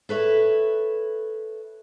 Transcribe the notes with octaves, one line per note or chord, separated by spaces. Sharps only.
A4 B4 C#5 E5